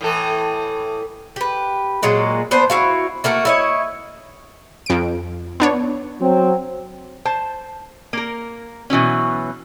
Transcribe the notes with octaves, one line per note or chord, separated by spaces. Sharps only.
A2 E3 A4
G4 B4
A#2 F#3 G#3 A#3
B3 D4 C5
E4 F#4 F5
A3 A#3 F#4 A#4
E4 C#5 D#5
F2 D7
B3 D4 C#5
F#3 C4
C5 A5
A#3 A#4
B2 E3 F#3 C#4